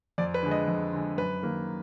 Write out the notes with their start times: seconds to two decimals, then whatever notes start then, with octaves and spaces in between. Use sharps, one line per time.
0.18 F2 D5
0.34 B4
0.43 D3 G#3
0.51 D#5
0.68 F2
0.93 D3 G#3
1.18 F#2 B4
1.42 D#3 A#3